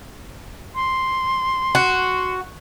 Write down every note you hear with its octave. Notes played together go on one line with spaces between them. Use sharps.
C6
F#4